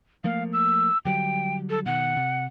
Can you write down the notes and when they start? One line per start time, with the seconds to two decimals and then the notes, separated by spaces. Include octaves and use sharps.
0.24 F3 A3 A#3 F5
0.53 E6
1.05 D3 F#3 G3 G5
1.70 A4
1.86 B2 D#3 F#5
2.17 C3